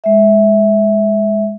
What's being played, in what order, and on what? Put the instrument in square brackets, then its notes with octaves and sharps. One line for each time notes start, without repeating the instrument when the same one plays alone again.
[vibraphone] G#3 E5